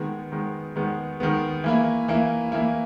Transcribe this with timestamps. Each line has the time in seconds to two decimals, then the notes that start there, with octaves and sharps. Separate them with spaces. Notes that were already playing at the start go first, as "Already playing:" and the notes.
Already playing: D#3 G#3 B3
0.32 D#3 G#3 B3
0.76 D#3 G#3 B3
1.20 D#3 G#3 B3
1.64 E3 A#3 E4
2.08 E3 A#3 E4
2.52 E3 A#3 E4